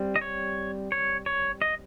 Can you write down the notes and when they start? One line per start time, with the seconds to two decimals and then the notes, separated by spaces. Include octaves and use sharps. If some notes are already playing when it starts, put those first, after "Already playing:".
Already playing: G3 C4
0.16 D#5
0.21 C#5
0.92 C#5
1.26 C#5
1.62 D#5